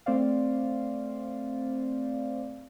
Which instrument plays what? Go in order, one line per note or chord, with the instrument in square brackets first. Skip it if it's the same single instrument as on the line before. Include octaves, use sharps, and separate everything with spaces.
[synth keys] A3 C4 C5 D5 F5